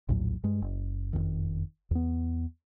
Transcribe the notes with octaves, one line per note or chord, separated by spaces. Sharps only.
A#1 D#2 A2 F#3
G2 G#3
F#1
F#1 C2 F2 D#3
E2 B3